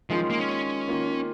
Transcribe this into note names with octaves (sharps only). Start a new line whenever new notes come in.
D#3 F3 G#3 C#4 F4
A#3
C#4
D#3 A#3 F4